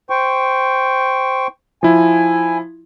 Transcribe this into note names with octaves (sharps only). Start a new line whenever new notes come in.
C5 G5 C#6
F3 E4 G#5